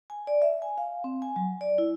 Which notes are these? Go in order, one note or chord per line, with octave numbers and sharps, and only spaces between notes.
G#5
D5
E5
G#5
F5
C4
G#5
F#3
D5
E4